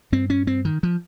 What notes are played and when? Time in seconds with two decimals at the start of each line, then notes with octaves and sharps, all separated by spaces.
0.12 G2 C4
0.30 C#4
0.47 C4
0.65 D#3
0.83 F3